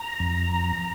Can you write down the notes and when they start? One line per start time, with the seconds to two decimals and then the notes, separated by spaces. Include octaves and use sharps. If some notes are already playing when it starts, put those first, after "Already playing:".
Already playing: A#5
0.20 F2